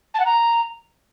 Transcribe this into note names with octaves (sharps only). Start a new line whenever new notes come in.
A5
F#5
A#5